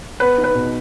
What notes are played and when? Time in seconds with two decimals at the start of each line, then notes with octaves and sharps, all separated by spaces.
0.20 B3 B4
0.38 D#4
0.44 B4
0.55 B2